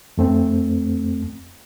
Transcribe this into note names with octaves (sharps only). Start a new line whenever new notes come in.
F2 A3 C4